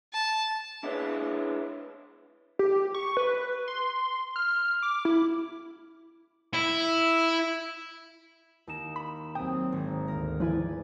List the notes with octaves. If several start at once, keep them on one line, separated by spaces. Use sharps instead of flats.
A5
D4 E4 G#4 B4 C#5
G4
C#6
B4
C6
F6
D6
E4
E4
D#2 D#4 E7
B5
D#2 F#3 C4 G5 D#6
G#1 D#3
D2 A#4
F3 E4 B4 D5 G#5